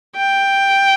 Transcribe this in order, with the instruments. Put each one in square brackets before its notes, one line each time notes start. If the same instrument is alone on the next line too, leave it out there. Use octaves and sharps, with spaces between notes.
[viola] G5